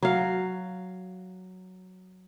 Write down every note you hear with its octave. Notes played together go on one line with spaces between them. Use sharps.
F#3 F5